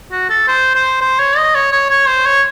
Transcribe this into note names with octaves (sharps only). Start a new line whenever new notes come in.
F#4
A4
C5
C5
C5
C#5
D#5
C#5
C#5
C#5
C5
C#5